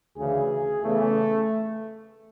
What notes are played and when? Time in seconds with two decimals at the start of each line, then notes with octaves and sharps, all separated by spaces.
0.17 D2 C#3 E3 G#4
0.83 E2 C#3 E3 A3